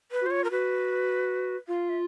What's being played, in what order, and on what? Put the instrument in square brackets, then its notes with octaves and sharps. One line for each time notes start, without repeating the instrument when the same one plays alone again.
[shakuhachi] B4
[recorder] F#4
[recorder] F4 [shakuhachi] C5
[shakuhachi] C#5
A#4
[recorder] F#4 [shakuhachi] B4
[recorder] F4 [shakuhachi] F5
[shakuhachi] E5